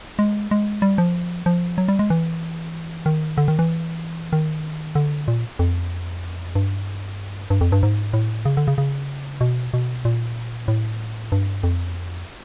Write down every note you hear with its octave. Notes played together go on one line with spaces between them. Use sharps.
G#3
G#3
G3
F3
F3
F#3
G3
G#3
E3
D#3
D3
D#3
E3
D#3
D3
A#2
F2
G2
G2
F2
G2
G#2
A2
C#3
D3
C#3
C#3
B2
B2
A#2
A2
G2
F2